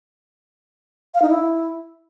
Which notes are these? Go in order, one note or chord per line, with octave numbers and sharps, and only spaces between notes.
F5
D#4
E4